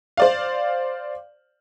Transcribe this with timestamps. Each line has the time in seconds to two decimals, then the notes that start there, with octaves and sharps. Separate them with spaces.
0.17 C5 D5 F5